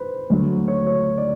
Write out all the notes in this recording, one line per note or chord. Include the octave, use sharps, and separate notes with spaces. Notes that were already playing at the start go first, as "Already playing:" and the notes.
Already playing: B4 C5
D2 D3 F#3
C#5
C#5
D5